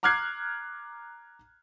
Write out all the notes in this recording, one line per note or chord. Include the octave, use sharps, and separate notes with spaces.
A#5 D6 F6 F#6 G#6 C7